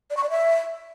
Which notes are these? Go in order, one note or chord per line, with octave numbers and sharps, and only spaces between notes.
D5
C#6
D5
E5